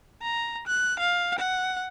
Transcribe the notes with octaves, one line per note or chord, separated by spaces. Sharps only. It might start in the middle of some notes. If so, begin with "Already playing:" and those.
A#5
F#6
F5
F#5